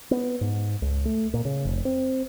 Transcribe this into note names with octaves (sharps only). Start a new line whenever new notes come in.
B3
G#2
C#2
A3
A#2
C#3
F1
C4